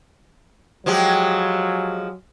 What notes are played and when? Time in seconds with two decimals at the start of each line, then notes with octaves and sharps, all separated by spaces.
0.86 F3 F#3 G#3 G4